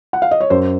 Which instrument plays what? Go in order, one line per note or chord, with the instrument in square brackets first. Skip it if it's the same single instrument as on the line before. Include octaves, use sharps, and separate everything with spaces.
[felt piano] F#5
F5
D#5
C#5
F#2 C5